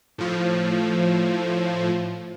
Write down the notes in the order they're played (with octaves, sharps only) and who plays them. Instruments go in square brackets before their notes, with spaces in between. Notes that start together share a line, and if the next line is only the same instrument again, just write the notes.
[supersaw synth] A2 F3